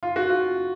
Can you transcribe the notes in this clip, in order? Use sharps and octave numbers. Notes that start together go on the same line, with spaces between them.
F4
F#4
F4